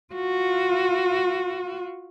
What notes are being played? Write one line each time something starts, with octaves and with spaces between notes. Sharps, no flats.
F4 F#4